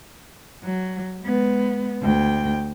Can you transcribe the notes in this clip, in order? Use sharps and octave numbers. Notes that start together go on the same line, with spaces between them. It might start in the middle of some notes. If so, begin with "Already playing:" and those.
F#3
G#3 B3
D2 G5